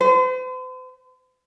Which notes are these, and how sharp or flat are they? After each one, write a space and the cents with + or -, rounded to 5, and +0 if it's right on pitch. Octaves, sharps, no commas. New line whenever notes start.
C5 -45